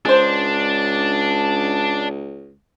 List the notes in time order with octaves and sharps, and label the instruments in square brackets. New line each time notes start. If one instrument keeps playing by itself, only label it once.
[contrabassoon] C#2 [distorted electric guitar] D4 [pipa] G#4 C5